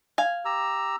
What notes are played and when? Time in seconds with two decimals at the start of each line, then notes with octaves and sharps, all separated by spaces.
0.18 F5 G#5
0.45 G4 A#5 E6